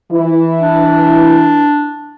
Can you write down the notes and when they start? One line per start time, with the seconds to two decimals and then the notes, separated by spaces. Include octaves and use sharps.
0.12 E3 E4
0.59 D4